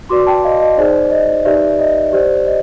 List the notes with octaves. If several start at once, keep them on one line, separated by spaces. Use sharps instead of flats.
F#4 B4 D5 C6 D6
G5 A5
D#5 F5
D#5
D#4 G#4 C5 D5
D#5
D#4 G4 B4 D5 E5
D#5
G4 C5 D5
D#5